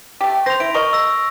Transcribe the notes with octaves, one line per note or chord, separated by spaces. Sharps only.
A3 G4
C5 A#6 F7
E4 D7
A#4 D#5 C#6
E6 A#6